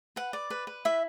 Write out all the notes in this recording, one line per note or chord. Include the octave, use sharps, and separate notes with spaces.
B4 F#5
D5
B4
B4
E4 E5